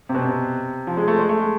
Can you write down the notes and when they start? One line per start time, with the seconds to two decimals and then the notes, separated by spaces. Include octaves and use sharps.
0.09 C3
0.15 B2
0.24 C3
0.87 F3
0.97 G#3
1.08 A3
1.19 G#3
1.29 A3
1.39 G#3